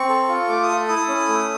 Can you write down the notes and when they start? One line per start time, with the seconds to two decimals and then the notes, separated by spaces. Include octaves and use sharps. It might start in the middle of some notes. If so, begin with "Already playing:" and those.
Already playing: C4 C#6
0.09 A4
0.29 F4
0.49 A3 D6
0.62 D#6
0.69 A4
0.88 E4 D#6
1.08 C#4
1.28 A3